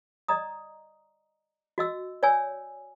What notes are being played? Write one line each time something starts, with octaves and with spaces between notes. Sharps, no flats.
D5 D#5 A#5 D#6
F#4 D#5 E6
C#5 D5 G#5 E6